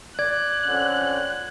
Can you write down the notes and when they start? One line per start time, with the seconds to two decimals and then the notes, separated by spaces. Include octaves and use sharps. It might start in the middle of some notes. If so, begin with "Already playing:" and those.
0.19 D5 F#6 G#6
0.65 F2 D3 C#4